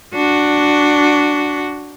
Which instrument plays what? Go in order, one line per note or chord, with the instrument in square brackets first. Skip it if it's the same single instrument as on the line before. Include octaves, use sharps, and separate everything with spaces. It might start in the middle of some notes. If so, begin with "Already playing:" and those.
[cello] D4 F#4